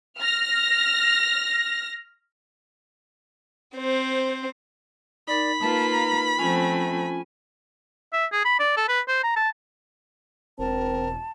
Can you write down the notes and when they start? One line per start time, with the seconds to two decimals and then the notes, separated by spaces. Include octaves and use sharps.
0.19 F6 A#6
3.75 C4 C5
5.28 D#4 A#4 D5 B5
5.61 A#3 D#4 F4 B4 A5
5.91 A#5
6.38 F3 A3 C4 C#4 F4 G#5
8.13 E5
8.32 G#4
8.45 B5
8.59 D5
8.77 A4
8.89 B4
9.08 C5
9.23 A#5
9.36 A5
10.59 E1 C4 A#4 A5